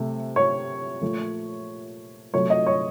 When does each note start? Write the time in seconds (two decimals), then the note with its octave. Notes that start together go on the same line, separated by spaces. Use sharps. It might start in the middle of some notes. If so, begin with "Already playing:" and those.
Already playing: C3 A3
0.36 C#5
1.01 A#2 F3 A3
2.34 C3 F#3 A3 C#5
2.50 D#5
2.66 C#5